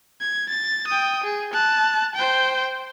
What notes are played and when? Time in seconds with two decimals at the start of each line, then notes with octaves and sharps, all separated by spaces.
0.21 G#6
0.49 A6
0.87 G5 D#6
1.24 G#4
1.53 A5 F#6
2.15 C5 G5